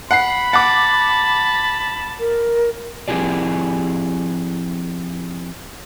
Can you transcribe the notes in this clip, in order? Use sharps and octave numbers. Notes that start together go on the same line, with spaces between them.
F#5 B5 C7
F#5 A5 D6
A#4
F3 C4 E4 G4 G#4 D5